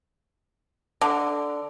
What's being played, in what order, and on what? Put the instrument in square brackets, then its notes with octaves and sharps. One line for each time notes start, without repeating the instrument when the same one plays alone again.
[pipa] D3